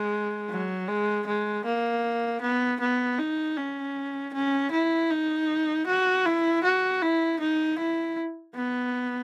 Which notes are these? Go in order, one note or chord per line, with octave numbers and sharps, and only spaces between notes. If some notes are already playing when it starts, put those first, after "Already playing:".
Already playing: G#3
F#3
G#3
G#3
A#3
B3
B3
D#4
C#4
C#4
E4
D#4
F#4
E4
F#4
E4
D#4
E4
B3